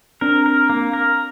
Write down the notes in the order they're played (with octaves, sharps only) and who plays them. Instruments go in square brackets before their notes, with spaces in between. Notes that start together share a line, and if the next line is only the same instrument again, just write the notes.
[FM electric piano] C4 D4 [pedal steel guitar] A#4
[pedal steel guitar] A#4
A#3
A#4